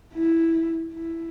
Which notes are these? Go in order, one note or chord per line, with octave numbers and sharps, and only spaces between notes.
E4
E4